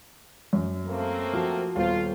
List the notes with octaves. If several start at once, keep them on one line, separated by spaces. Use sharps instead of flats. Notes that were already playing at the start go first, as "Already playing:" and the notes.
F#2
A3 A#3 C4
F3 F#4 F6
D#1 B3 F4 C5